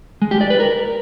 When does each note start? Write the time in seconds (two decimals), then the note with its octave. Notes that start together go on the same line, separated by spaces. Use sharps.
0.22 G#3
0.31 G4
0.41 D5
0.50 B4
0.60 A#4